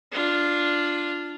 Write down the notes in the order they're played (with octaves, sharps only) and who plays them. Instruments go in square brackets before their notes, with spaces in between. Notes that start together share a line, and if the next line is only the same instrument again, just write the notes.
[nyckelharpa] D4 F4